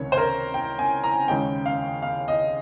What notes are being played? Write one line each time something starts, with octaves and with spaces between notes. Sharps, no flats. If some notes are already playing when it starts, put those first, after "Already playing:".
Already playing: C#2 C3 D#3 C#5
C5
A#4
G5
G#5
A#5
D#2 C#3 G#3 C#4 G5
F5
F5
D#5